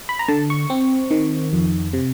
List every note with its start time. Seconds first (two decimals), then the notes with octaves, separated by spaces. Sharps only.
0.09 B5
0.19 A#5
0.28 D3 A5
0.50 C#6
0.70 C4
1.11 D#3
1.53 F2
1.93 C3